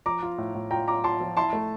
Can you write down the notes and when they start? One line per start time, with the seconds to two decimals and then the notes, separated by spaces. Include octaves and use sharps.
0.06 F3 A#5 D6
0.22 F4
0.38 A2
0.55 A2
0.71 F4 G5 A#5
0.88 F4 A#5 D6
1.04 F4 A5 C6
1.20 F3
1.37 E4 A5 C6
1.53 A3